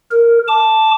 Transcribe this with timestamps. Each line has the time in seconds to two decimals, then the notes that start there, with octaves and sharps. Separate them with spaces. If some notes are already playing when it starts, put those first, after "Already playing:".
0.11 A#4
0.48 A5 D6